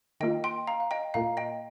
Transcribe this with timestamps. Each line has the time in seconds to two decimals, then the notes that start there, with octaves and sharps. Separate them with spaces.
0.20 D#3 A#3 F4 D#5 G5
0.44 G5 C6
0.67 F5 A#5
0.80 F5
0.91 D#5 G5
1.14 A#2 A#3 F4 F5 A#5
1.37 D#5 G5